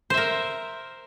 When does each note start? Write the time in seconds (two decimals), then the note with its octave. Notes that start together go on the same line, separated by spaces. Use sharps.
0.10 C5
0.14 E5
0.17 A#4